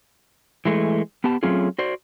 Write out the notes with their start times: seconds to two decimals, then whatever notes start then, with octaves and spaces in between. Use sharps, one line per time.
0.65 E3 G#3 A3
1.24 B3 G4 A5
1.43 F#3 A3 C4 C#4 F4 G#4
1.79 F#4 C5 D5